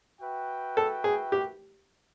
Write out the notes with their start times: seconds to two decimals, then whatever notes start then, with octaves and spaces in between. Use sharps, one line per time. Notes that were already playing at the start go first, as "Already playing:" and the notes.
0.21 F#4 B4 E5 G5
0.77 A4
1.04 G#4
1.32 G4